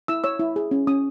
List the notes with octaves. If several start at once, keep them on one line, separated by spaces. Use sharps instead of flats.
E4 E6
C#5 E6
E4
G#4
C#4
C#4 D#6